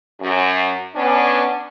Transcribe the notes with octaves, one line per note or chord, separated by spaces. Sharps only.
F#2
B3 C#4 D4